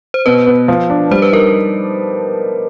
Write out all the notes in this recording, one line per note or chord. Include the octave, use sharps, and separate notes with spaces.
C5
B2 B4
B3
F3
D4
G3 C5
B4
D#4 A#4